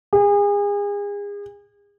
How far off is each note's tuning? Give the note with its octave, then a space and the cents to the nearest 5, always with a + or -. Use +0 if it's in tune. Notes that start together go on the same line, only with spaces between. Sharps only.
G#4 -35